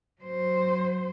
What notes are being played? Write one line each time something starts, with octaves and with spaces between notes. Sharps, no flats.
F#3 C5